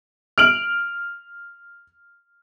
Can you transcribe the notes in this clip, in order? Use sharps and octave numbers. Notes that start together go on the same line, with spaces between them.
F6 D7 F#7